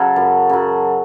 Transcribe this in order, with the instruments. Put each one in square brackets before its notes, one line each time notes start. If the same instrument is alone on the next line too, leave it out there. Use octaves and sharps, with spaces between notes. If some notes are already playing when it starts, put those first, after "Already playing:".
Already playing: [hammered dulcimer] C#3 F#3 A4
F#2
C#3 F#3